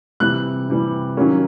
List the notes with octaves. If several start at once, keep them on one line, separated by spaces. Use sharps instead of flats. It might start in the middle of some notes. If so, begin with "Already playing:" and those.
C3 E3 G3 F#6
C3 E3 G3
D#3 F#3 A#3 C#4